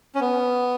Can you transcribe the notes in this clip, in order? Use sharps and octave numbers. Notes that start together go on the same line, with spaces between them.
C#4
B3